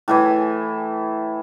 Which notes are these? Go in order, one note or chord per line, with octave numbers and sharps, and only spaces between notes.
A2 E3 G#5